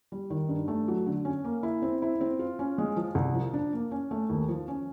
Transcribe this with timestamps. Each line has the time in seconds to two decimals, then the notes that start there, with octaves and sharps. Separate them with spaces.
0.12 G3
0.30 D#3
0.49 G2
0.68 A3
0.88 F#3
1.06 D3
1.25 C#4
1.44 A#3
1.63 E4
1.82 C4
2.02 E4
2.21 C4
2.39 F4
2.59 C#4
2.78 G#3
2.96 F3
3.15 C2
3.35 F3
3.54 D4
3.73 A#3
3.91 C#4
4.11 A3
4.29 D#2
4.48 F3
4.68 C#4